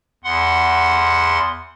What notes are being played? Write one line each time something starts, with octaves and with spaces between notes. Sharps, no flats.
E2 F#5 C6